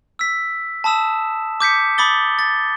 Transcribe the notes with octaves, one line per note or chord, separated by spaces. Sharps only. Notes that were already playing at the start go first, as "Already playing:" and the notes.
E6 B6
A5 B5 D#6 E6 E7
D6 G6 B6 C#7
B5 D6 D#6 A6 G7
A6